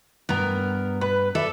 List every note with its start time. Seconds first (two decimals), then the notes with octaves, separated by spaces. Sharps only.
0.29 G2 B3 A#4
1.01 B4
1.35 A4 D5 E5